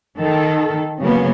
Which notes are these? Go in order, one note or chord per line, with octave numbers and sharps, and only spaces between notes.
D#3 A4
C#3 F#3 A#3 B3 C#4